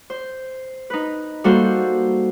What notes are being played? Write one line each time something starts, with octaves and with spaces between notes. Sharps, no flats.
C5
D#4 B4
G3 A#3 F#4 A4 C5